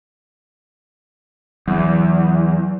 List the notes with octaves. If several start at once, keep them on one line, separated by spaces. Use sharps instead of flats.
E2 F#3